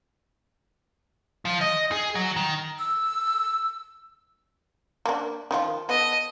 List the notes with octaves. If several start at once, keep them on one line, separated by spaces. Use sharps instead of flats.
F3
D#5
G#4
F#3
D#3
E6
A#3 D4
D#3 F3 F4
B3 A4 D#5